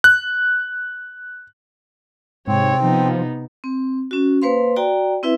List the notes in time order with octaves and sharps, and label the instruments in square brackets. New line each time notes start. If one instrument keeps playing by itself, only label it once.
[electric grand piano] F#6
[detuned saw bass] G#2 [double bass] C3 [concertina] C4 [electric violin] C#5
[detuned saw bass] F3 [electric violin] B3 D#4
[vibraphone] C4
C#4 F#4
A#3 B4 C5 F5 C6
F#4 D5 G5 A#5
C4 E4 B4 E5